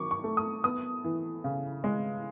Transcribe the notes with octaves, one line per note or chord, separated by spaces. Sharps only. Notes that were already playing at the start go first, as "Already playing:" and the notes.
Already playing: D#3 F#3 C#6 D6
C#6
A3
D#6
B3 D#6
E3
C#3
G#3